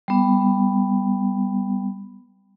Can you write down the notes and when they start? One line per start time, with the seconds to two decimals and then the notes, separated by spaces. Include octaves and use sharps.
0.08 G3 B3